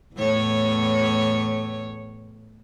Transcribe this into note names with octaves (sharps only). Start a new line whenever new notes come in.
E2 A2 C#5